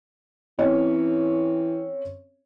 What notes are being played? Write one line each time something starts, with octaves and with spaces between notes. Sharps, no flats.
E3 C4 C#4 C#5